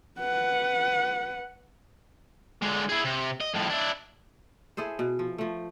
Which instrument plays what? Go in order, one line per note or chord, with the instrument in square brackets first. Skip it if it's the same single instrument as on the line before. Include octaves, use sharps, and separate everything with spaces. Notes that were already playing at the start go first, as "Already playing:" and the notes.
[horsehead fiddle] B4 F#5
[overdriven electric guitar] D3 G#3
E4 G#4
C3
D#5
F2 A2
D4 E4
[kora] E4 G#4 A4 C5
B2
F3
F3 A3